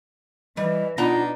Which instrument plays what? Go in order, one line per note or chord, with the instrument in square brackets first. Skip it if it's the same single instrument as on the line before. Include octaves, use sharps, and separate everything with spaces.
[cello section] E3 [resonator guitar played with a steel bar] G3 [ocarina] D#5
[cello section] B2 D4 [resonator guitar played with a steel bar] B3 D#5 A#5 [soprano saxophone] D#4 [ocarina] F4